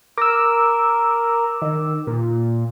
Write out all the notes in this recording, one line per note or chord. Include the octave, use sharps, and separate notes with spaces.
A#4 D6 E6
D#3
A#2